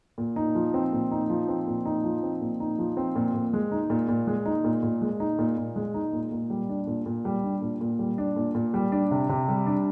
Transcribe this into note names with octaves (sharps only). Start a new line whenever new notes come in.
A#2
D#4
F3
C4
A#2
D#4
F3
C4
A#2
D#4
F3
C4
A#2
D#4
F3
C4
A#2
A#2
G#3
D#4
A#2
A#2
G#3
D#4
A#2
A#2
G#3
D#4
A#2
A#2
G#3
D#4
A#2
A#2
G3
D4
A#2
A#2
G3
D4
A#2
A#2
G3
D4
A#2
A#2
G3
D4
C3
C3
G3
D4